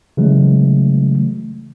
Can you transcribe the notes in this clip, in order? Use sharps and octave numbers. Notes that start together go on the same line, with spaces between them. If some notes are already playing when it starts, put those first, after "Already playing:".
C#3 E3 F#3 G#3 A3